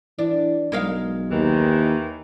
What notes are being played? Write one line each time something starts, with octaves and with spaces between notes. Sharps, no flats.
E3 D4
B1 G#3 A#4 F5
D#2 D#3 E3